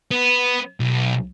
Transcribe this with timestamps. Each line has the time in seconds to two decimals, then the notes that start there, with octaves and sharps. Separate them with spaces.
0.11 B3
0.80 B1